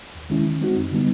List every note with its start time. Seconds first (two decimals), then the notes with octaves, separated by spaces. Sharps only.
0.15 D#2
0.30 D#3 G#3 C#4 E4
0.46 D#3
0.61 G#3 C4 D#4 F#4
0.76 F#2
0.91 D3 G3 B3 D#4